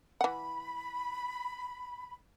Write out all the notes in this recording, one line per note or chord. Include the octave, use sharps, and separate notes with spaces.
E3 F#5 B5